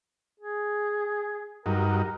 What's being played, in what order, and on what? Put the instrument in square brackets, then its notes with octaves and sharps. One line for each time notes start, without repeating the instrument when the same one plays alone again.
[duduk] G#4
[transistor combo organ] G2 F#3 D#4 [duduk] A#4